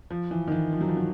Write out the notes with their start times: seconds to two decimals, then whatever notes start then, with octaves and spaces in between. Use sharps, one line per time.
0.10 F3
0.31 E3
0.47 D#3
0.52 E3
0.73 F3
0.81 F#3
0.88 F3
0.97 F#3